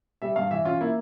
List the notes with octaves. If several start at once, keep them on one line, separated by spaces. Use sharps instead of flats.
G3 E5
G2 F5
E3 E5
C#4 F4
A#3 E4